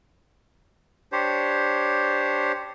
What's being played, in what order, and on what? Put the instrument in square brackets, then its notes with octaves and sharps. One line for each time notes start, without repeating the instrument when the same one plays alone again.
[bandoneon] D4 G4 C5 C#5